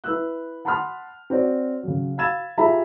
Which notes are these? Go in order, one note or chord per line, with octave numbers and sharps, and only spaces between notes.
E4 B4 E6 F#6
F#5 A5 B5 C6 D#6 F6
C4 F#4 C#5 D5
C#3 F#3
F5 B5 E6 G#6 A6 E7
F4 G4 G#4 E5 A#5 B5